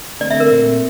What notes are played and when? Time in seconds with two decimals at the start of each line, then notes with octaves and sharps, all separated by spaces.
0.20 D3 A3 C4 D5
0.30 E5
0.40 A#4
0.51 A#2 A3 C4